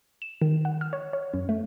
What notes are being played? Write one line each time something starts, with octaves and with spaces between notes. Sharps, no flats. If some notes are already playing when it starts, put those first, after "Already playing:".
E7
D#3
F#5
F6
C#5
C#5
F#2
A3